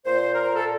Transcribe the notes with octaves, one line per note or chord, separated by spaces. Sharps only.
A#2 C5
A#4
A#2
A4